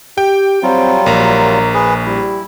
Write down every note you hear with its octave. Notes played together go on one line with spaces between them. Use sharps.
G4 G5
F#3 G3 C4 F4
A#1 A#4 A#5
G#4 B4
G3 E4